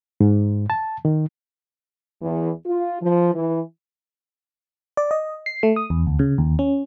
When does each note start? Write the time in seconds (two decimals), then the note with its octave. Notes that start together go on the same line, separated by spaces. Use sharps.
0.20 G#2
0.70 A5
1.05 D#3
2.22 E2
2.66 F4
3.02 F3
3.34 E3
4.97 D5
5.11 D#5
5.46 C7
5.63 A3
5.76 D#6
5.90 E2
6.07 D2
6.19 C#3
6.38 D#2
6.59 C#4